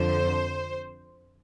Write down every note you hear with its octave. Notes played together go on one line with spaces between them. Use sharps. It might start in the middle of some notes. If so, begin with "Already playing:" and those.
Already playing: F2 D3 F3 C5